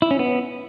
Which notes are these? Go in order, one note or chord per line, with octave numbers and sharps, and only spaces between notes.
E4
C#4
B3